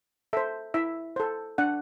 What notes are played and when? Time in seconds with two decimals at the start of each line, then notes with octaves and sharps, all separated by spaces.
0.33 A4 C5 E5
0.74 E4 E5
1.16 A4 C5
1.58 D4 F#5